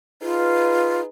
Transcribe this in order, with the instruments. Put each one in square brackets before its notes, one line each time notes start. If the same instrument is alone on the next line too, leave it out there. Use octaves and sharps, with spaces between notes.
[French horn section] D#4 G#4 B4 [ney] F4